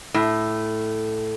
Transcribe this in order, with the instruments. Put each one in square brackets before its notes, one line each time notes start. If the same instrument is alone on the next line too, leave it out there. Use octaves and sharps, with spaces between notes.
[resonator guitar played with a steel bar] A2